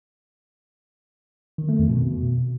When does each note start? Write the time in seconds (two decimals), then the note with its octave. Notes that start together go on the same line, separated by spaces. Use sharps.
1.58 D#3
1.69 A3
1.79 F2
1.90 B2